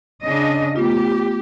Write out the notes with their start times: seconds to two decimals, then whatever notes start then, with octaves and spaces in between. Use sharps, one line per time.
0.22 C#3 D4 D#5
0.76 A3 B3 F4 G4